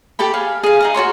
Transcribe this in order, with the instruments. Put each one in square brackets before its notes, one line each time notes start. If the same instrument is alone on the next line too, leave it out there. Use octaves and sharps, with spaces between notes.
[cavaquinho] G4 A4 G5 B5
G#4 F5
G#4 F5
D#4 G#4 D#5
F#4 A4 C#5 C6